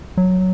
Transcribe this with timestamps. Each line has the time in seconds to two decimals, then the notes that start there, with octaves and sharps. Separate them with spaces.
0.17 F#3